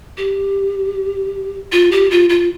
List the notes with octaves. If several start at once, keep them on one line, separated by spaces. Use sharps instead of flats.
G4
F4
G4
F4
F4